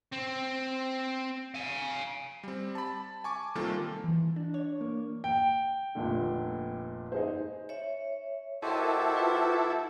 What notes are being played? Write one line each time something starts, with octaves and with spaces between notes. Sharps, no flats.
C4
F5 G#5
G3 C4
A5 B5
G#5 C#6 D6
C3 D#3 G3 A#3 F4 A4
E3
D4
C#5
A#3
G5
F1 A#2 D3
D#4 G#4 C5
C#5 E5
E4 F#4 G4 A4 A#4 C5 D#5
F4 B4